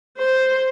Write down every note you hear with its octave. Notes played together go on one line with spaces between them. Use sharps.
C5